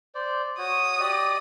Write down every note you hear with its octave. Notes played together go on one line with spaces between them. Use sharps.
C5 D5
F#4 C#5 D#6
G4 D5 D#5